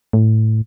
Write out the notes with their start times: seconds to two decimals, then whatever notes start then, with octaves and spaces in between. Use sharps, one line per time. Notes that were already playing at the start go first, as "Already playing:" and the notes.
0.13 A2